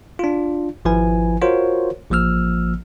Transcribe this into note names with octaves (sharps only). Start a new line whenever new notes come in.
D4 F4
G#1 F3 E4 B4 G#5
F4 F#4 A#4 C5 C#5
A1 F3 A#3 E6 F6